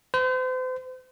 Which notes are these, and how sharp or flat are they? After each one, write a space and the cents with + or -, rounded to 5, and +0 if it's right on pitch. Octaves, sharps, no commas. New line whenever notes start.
C5 -40